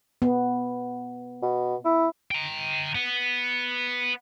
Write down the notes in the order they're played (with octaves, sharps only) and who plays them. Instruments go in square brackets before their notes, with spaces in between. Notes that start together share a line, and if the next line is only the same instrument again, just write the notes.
[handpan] B3
[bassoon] B2
E4
[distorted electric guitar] G5 A#5
B3